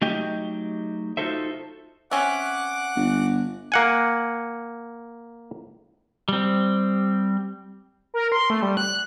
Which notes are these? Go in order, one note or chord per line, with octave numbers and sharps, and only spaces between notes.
F#3 A3 D#4 G4 D#5 G5
D#4 F4 F#4 A4 C5 E5
C4 C#4 E5 F#5 D6 F#6
G1
A#3 F#5 G#5
G3 C4
A#4
C6
A3
G3
F#6